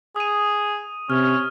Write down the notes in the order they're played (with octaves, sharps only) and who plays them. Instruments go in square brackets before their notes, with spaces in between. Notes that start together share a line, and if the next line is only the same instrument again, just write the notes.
[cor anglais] G#4 [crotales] D#6 D#7
[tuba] C3 [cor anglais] C#4 [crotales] F6